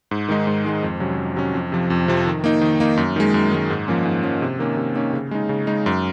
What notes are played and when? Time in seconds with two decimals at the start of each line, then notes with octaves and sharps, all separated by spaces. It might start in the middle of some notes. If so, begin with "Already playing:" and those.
0.11 G#2
0.28 D#3 G#3 D#4
0.47 G#2
0.65 D#3 G#3 D#4
0.83 F2
1.00 C3 F#3 C#4
1.18 F2
1.36 C3 F#3 C#4
1.54 F2
1.72 C3 F3
1.90 F2
2.08 C3 F3
2.27 D#3
2.44 A#3 D#4
2.62 D#3
2.80 A#3 D#4
2.97 F#2
3.16 D#3 G#3
3.34 F#2
3.52 D#3 G#3
3.70 G#2
3.88 F3 A#3 C#4
4.05 G#2
4.23 F3 A#3 C#4
4.42 C3
4.59 D#3 A#3 C#4
4.77 C3
4.95 D#3 A#3 C#4
5.13 C#3
5.31 G#3 D#4
5.49 C#3
5.67 G#3 D#4
5.86 F#2